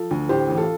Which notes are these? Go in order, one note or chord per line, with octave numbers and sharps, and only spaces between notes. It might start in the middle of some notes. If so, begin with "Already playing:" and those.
Already playing: F3 F4 A4
D2
A2 G4 C5
A1
F4 A4